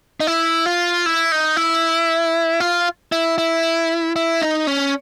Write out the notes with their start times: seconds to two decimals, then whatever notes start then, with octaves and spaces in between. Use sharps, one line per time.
0.20 D#4
0.27 E4
0.66 F4
1.06 E4
1.32 D#4
1.57 E4
2.60 F4
3.12 E4
3.38 E4
4.16 E4
4.42 D#4
4.67 C#4